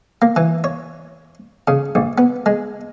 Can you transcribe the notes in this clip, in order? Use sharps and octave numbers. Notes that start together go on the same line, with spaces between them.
A#3
E3
C#5
C#3
A#1
B3
G#3